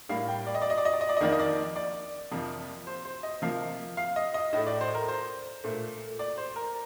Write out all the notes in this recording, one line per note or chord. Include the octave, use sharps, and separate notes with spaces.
A2 G3 A#3 F5
G5
D5
D#5
D5
D#5
D5
D#5
D5
D#5
D5
D#5
F2 D#3 A#3 D5
D#5
D5
D5
F2 C3 F3 A#3
C5
C5
D#5
C3 F3 A#3 F5
F5
D#5
D#5
A2 A3 D#5
D5
C5
A#4
C5
A#2 A3
D5
C5
A#4